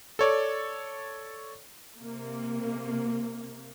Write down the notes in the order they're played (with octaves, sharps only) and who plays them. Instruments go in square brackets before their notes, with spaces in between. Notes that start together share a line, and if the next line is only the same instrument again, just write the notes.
[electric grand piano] A4 C#5 D5
[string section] C3 A#3